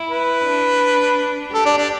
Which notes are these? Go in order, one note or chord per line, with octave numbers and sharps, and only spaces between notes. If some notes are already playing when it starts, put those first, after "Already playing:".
Already playing: E4
B4
D4
G4 A4
D4
D4